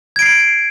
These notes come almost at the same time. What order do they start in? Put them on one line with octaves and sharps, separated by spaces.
G#6 D7 C7